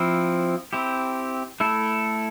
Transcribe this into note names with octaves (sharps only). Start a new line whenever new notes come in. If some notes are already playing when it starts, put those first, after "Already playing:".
Already playing: F3 C4 E4
C4 E4 G4
A3 E4 A4